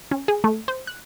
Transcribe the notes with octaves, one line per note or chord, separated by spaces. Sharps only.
C#4
G#4
A3
C5
F#6